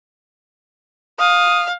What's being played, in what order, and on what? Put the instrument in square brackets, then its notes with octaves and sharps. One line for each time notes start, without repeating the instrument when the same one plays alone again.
[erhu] F5 [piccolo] D#6